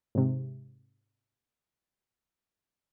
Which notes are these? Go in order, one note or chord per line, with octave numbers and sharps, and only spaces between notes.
G#2 C3